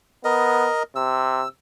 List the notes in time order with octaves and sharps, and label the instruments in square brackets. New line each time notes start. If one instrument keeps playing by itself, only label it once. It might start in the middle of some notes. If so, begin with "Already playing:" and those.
[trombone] B3 [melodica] A#4 D#5
[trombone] C3 [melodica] E6